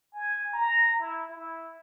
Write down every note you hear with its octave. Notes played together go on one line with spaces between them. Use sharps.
G#5
A#5
E4
E4